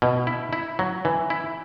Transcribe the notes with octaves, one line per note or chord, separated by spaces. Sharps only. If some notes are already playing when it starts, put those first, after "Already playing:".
B2
E4
E4
F#3
E3
E4